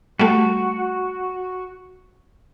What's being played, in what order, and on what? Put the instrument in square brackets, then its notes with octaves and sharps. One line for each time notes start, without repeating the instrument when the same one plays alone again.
[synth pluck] G3 A3 [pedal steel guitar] F#4